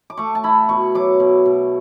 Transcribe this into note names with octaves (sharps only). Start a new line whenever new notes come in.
D6
A3 C#6
A5
E4 B5
B2 C#6
F#3 D6
B2
B2